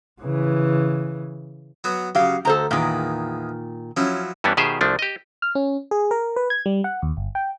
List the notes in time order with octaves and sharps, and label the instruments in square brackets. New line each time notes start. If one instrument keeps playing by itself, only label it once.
[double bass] C#3 E3
[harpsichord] F#3 B3 F#4
[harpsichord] C#3 F#3 [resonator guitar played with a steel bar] G4 F5
[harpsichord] D2 [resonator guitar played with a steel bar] A4 C5 A#5
[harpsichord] E2 G#3 [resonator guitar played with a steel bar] A#2 D#3
[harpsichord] F3 F#3 E4 [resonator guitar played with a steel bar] C#4
[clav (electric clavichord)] G2 E3 G3 B3 C#4 D4
B2 D#3 G4 G#4 C5 E5
C2 F3 A3 D4
G4 D#5
[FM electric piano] F6
C#4
G#4
A#4
B4
G#6
G3
F#5
D#2
G1
G5